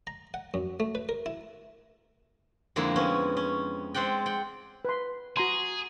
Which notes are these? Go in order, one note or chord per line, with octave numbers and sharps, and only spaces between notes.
A#5
F#5
F#2
A3
B4
A#4
E4
F2 D3 G#3 A#3 E4
B3 C#4
C#4
G#3 C4 D5 F#5 G5
F#5 G5
B4 C6
F#4 G#4 A#5 C6